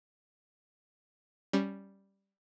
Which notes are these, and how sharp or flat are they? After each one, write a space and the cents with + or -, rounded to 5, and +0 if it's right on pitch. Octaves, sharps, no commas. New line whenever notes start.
G3 +0 C#4 +0